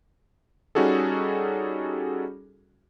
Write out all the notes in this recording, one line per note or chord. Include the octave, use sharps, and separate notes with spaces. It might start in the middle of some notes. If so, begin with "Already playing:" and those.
G3 C#4 D#4 F#4 G#4 A4